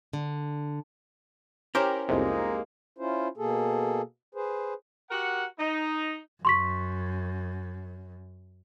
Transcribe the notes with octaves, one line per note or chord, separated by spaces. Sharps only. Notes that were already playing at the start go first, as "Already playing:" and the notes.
D3
C#4 E4 G4 A#4 C5
C2 F2 C3 G#3 A#3 D#4
C#4 E4 F4 C5
B2 A#3 G#4 A4
G#4 B4 C5
F#4 G4 A#4 F#5
D#4
F#2 C6 C#6 B6